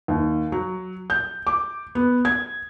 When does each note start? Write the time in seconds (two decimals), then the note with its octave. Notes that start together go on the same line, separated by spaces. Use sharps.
0.08 D#2
0.52 F#3
1.10 G6
1.47 D6
1.95 B3
2.25 G#6